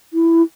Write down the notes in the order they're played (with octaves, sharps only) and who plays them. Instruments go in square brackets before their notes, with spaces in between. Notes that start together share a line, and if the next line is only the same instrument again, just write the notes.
[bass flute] E4